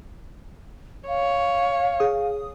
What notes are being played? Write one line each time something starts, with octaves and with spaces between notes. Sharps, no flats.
C#5 F5
G#4 D#6